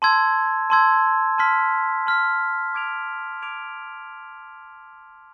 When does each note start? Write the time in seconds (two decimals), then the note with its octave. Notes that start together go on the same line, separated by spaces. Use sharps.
0.02 A5 C6 E6 G#6
0.70 A5 C6 E6 G#6
1.38 A5 C6 F6 B6
2.06 A5 C6 F6 B6
2.74 D6 G#6 D7 F7
3.42 D6 G#6 D7 F7